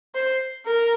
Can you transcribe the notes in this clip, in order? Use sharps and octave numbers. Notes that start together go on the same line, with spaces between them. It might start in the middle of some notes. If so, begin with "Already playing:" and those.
C5
A#4